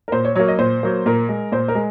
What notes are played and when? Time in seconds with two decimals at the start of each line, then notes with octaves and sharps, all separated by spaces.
0.08 A#4
0.12 A#2 C5
0.25 C#5
0.35 F#3 A#3 C#5
0.48 D#5
0.59 A#2 C5
0.83 F#3 A#3
1.06 A#2 A#4
1.29 G#3
1.52 A#2 C5
1.68 A#4
1.75 G#3